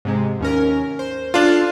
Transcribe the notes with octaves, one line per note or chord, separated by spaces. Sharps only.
G#2 C3 G#3
D#2 C#4 A#4
C5
D4 F4 A4 F5